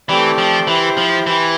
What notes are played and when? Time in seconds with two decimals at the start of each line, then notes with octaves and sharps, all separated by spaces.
0.09 E3 A3 C4 G4 D5
0.38 F3
0.67 E3 E4 G4 C5
0.97 F3
1.26 E3 E4 G4 C5